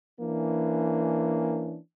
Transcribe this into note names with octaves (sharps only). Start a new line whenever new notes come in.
E3 A#3 C#4 D4